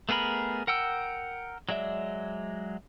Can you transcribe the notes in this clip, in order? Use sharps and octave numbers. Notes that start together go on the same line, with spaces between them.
A3 B3 G#4 A#4 B5
A#4 F#5 G5 E6
F#3 G#3 D5 E5